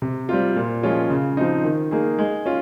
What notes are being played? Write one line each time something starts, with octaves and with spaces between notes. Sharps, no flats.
C3
G3 C4 F4
A#2
F3 G#3 C#4 F4
C#3
F3 C4 D#4
D#3
A#3 D#4 G#4
G#3
C#4 F4